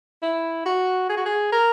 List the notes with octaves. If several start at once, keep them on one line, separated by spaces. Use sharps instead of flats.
E4
F#4
G#4
F#4
G#4
A#4